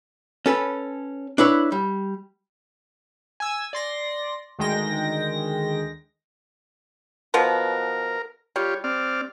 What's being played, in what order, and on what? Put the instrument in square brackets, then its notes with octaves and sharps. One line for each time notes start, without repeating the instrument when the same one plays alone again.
[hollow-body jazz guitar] C#4 A4 B4
D4 E4 B4 C#5
G3
[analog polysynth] G#5 E6
D5 C6 A#6
D2 D#3 G#3 G5 A#6
[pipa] B2 F3 B3 [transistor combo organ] A#4
[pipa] G3 [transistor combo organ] F4 G4 C#5
[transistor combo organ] C4 D5 F6